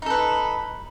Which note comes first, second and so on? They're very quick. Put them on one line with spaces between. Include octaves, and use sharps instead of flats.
D#4 A4 B4